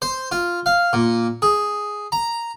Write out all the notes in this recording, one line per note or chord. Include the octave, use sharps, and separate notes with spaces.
C5
F4
F5
A#2
G#4
A#5